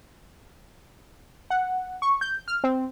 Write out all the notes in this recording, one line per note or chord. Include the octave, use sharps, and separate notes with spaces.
F#5
C#6
G6
F6
C4